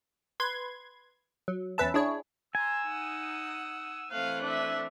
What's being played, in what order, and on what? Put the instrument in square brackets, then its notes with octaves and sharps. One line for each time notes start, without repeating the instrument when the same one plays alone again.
[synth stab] B4 C6 G#6
F#3
E2 C#4 B4 E5 A5
D4 E4 G#4 C#5
[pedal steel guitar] G#5 [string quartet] A#5 C6 [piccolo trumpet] E6
[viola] D#4 [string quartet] F#5 D#6
[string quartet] E3 A3 C4 [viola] F5 [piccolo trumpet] F#6
[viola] D4 E5